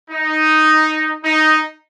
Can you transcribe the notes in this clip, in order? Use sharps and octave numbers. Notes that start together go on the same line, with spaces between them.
D#4
D#4